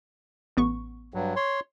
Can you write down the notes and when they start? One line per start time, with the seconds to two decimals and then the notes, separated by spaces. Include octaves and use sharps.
0.57 A1 B3 C#6
1.14 G2 F#3
1.36 C#5 C6